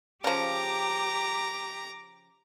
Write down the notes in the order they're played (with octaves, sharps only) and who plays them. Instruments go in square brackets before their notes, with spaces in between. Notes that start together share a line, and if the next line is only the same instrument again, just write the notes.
[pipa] C#3 F3 [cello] G4 [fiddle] A#5 [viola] D6